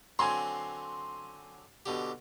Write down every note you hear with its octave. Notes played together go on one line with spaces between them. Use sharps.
D3 F#3 C4 G#5 C6
B2 D3 G4